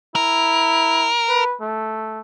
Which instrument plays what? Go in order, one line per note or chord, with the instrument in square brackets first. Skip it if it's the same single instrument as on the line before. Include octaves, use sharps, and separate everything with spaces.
[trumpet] E4 [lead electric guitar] A#4
[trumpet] B4
A3